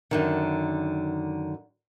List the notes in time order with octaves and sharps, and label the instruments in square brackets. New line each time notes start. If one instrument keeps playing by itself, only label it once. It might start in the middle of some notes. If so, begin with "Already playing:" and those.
[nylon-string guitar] F#2 D3 D#3